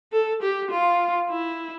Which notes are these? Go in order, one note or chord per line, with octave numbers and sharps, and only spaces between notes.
A4
G4
F4
E4